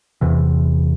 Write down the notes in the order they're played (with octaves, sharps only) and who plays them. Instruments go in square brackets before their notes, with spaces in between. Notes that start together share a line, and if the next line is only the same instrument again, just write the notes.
[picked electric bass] E2 C3 E3